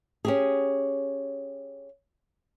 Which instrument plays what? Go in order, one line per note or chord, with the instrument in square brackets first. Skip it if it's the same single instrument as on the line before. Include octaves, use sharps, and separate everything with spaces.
[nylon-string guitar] C#4 G4 G#4